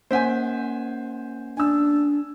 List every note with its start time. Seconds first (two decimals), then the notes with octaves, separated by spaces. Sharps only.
0.11 A#3 C#4 C5 F#5 G#5
1.57 D4 G#5 E6